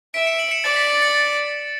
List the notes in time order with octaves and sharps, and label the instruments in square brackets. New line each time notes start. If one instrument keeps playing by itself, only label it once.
[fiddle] E5 [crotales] B6 D7
[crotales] C#7 E7
D7 F#7
C#7 E7
[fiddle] D5 [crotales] A6 C#7
[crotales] B6
A6 C#7
A6 C#7